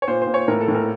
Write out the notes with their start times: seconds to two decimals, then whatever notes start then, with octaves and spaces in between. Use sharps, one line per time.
0.02 C#5
0.08 A#2 C5
0.22 C5
0.27 A#2
0.34 C#5
0.48 A2 A#4
0.61 A4
0.68 A2
0.75 A#4